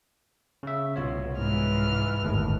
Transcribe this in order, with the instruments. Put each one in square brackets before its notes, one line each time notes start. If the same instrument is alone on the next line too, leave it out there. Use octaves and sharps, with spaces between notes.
[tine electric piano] C#3 E5
[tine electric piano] C2 F4 C#5 [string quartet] B2
[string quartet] G#2 E3 F6
[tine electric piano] G1 D#2 A2